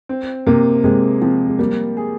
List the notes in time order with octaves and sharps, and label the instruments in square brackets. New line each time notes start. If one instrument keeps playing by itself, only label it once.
[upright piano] C4
[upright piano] C3 [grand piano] A#3
[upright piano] C3 [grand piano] G#3
[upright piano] F3 [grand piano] C4
[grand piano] G#3
[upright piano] G3 [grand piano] A#3
[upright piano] G#4